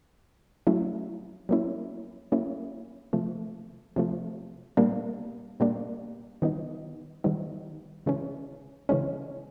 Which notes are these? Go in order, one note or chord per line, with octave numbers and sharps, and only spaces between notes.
F#3 A3 C#4 E4
F#3 A#3 C#4 E4
F#3 A#3 C#4 E4
C3 F3 A3
C3 F3 A3
A#2 G3 A#3 D4
A#2 G3 A#3 D4
D#3 G3 B3 D#4
D#3 G3 B3 D#4
C#3 E3 G#3 C#4
C#3 E3 G#3 C#4